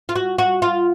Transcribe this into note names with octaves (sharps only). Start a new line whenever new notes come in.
F4
F#4
F#4
F4